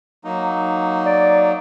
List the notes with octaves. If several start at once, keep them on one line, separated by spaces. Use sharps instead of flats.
F#3 A#3 D#4
D5